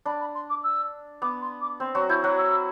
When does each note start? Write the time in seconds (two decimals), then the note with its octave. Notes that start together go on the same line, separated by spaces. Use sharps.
0.05 D4 B5
0.20 B5
0.35 C6
0.50 D6
0.64 E6
1.22 B3 D6
1.41 C6
1.61 D6
1.80 C4 C6
1.94 F#3 F#4 C6
2.09 E4 G6
2.23 F#3 F#4 F#6
2.38 E6